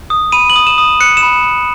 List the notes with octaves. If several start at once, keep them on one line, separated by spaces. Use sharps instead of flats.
D#6
B5 D#7
F#7
D#6
E7
D#6
F#6 C#7
E7
B5